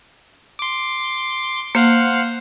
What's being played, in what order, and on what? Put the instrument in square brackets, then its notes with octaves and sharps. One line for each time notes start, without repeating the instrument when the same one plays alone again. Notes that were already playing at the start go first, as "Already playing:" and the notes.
[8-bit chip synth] C6 D6
[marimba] A#3 [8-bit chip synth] C5 F5 F#5